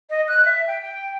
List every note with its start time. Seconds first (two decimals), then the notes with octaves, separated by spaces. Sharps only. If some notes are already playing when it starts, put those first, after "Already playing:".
0.10 D#5
0.28 F#6
0.45 E5
0.67 G5
0.82 G5